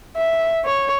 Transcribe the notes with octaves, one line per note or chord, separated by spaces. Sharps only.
E5
C#5